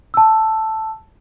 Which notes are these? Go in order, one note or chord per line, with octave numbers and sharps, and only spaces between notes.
A5 E6